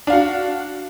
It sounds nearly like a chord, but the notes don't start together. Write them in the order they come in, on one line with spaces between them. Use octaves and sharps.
D4 F5 F#4